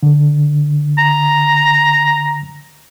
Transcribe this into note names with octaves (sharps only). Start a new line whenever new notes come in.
D3
A#5